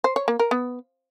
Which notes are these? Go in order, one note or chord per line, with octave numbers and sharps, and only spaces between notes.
C5
C#5
A#3
A#4
B3